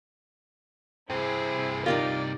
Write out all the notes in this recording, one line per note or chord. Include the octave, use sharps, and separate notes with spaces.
G2 C3 C4 E4 G#4
D#4 F4 G4 A#4 D5